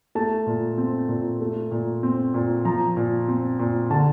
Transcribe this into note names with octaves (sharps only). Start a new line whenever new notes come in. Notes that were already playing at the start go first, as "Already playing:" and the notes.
A3 A5
A#2
C4
A#2
A3
A#2
C4
A#2
F3 A#5
A#2
C4
A#2
D3 A5